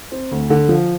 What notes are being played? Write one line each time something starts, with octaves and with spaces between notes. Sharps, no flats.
C4
D2
D3
F3